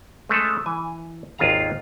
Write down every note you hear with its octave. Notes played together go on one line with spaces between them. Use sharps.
G#3 A3 C#4 A4
E3 G#5
G#1 D#2 F4 G#4 F5 A#5